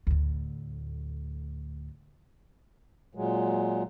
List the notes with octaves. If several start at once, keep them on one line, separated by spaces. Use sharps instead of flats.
D2 A2
A#2 F#3 G#3